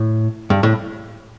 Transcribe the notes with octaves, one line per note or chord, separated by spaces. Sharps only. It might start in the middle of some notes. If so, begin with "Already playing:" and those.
Already playing: A2
G2
A2